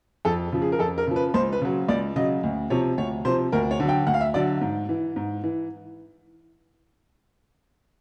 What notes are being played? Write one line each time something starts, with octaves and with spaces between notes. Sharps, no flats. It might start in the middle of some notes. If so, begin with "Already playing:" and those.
F2 A4
C#3 F3
G#4
A#4
F2 A4
A#4
C#3 F3
B4
C#2 C5
B4
C#3 F#3
C#2 D5
C#3 F#3 D#5
D2
C3 F3 C#5
D2 C#5
C3 F3 C5
D2 A#4
C#5
D3 F#3
G5
D2 F#5
F5
E5
D3 F#3 D5
G#2
E3
G#2
E3